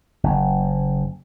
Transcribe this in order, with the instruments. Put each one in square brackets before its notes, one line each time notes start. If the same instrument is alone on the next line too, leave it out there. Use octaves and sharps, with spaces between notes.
[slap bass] F#1